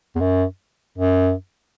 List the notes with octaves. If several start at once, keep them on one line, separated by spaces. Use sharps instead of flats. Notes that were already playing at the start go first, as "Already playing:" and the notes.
E2
F#2
F#2